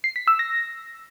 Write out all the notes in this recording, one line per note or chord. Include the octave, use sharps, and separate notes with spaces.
C7
B6
E6
A#6